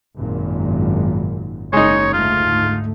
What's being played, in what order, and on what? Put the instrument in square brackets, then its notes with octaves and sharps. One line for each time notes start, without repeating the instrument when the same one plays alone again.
[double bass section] G#1 F#2 A#2
[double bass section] F#1 [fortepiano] G#3 D#4 [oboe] C#5
[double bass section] D2 G#2 A3 [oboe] F4